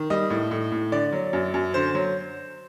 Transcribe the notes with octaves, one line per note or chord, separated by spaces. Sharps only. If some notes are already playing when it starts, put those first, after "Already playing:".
Already playing: D#3
G3 D#5
A2
A2
A2
D3 D5
F#3
F#2
F#2
D3 C5
F#3